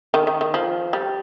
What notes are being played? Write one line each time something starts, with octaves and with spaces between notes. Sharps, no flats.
D#3
D#3
D#3
F3
G3